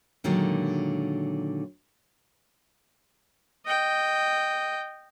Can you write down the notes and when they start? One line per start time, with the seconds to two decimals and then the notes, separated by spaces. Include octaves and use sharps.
0.24 A#2 D3 D#3 F#3 G#3
3.66 D#5 G5